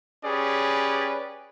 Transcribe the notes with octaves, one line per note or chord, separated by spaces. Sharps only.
C#4 G4 G#4 B4 D5